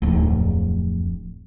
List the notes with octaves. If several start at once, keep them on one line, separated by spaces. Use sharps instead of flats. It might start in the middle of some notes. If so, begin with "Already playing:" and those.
D1 F2